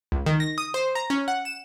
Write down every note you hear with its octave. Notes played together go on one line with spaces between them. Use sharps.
C#2
D#3
A#6
D#6
C5
A#5
C#4
F#5
E7